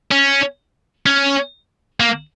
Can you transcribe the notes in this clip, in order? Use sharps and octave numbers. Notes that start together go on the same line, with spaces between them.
C#4
C#4
A#3